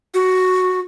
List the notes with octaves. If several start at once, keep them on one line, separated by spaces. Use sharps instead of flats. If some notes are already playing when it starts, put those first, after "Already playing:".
F#4